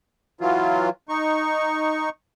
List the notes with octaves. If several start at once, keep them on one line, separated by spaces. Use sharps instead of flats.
E3 F#3 F4
D#4 C#6